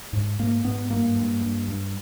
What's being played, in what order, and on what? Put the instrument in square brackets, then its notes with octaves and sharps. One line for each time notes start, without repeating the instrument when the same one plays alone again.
[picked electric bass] G#2
G#2 A#3
G#2 B3
G2 A#3
G2
G2
G2